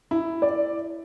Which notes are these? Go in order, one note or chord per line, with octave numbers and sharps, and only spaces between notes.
E4
D5